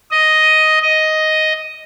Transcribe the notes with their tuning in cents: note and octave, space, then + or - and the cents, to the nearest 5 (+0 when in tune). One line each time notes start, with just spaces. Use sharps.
D#5 +5
D#5 +5